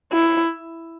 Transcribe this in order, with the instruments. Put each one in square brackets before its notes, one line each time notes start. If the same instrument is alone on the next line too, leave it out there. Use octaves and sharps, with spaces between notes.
[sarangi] E4